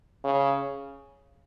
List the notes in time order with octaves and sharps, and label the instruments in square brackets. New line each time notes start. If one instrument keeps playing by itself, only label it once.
[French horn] C#3